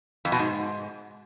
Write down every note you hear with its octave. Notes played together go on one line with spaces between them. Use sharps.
F2
B2
G#2